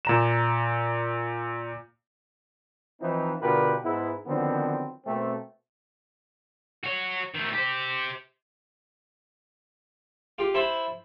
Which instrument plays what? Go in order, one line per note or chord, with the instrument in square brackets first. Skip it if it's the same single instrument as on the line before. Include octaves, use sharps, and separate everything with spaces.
[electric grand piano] A#2 A#5 E7
[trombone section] E3 F3 C4 D#4
B2 D3 F4 G4 A#4 B4
G#2 B3 E4
D3 D#3 F3 F#3 B3 C4
B2 A3 A#3 C4
[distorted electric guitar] F#4 C#5
D#3 A3
G4 C5
[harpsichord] F4 G4
E4 C5 A5 B5 C6